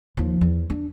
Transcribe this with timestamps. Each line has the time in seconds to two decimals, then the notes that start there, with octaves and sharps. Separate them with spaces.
0.17 D#2 F3
0.41 E2
0.70 D4